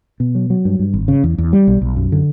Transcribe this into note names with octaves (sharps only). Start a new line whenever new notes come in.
B2
F#3
F#3
G2
G2
G#1
C#3
E2
E2
G3
B1
B1
F#2
D3